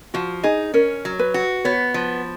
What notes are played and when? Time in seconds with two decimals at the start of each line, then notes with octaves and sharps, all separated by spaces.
0.14 F3 F#4
0.43 D#4 G#4
0.74 C#4 A#4
1.05 F#3
1.19 B4
1.34 F#4
1.65 B3 C#5
1.94 F3